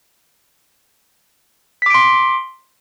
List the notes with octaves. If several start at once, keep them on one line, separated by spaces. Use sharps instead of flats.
C6 D6 B6 D7